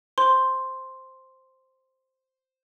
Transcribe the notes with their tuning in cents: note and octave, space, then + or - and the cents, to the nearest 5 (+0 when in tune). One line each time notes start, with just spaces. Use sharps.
C5 +0 C6 +0